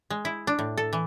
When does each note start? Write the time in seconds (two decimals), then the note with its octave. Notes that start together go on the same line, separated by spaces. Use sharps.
0.10 G#3
0.25 E4
0.47 D4
0.59 A2
0.77 A4
0.93 E3